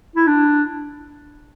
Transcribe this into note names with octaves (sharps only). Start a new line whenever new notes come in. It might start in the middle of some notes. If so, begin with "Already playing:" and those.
E4
D4